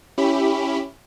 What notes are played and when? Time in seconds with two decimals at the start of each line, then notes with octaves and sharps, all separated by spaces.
0.18 C#4 E4 G4 B5